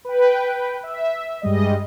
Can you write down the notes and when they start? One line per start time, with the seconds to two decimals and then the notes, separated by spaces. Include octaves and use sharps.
0.05 B4 G5
0.83 E5
1.42 G2 G3 G#3 D#5